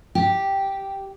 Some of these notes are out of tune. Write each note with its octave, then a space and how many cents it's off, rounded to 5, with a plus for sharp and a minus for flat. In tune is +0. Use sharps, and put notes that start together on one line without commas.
G4 -5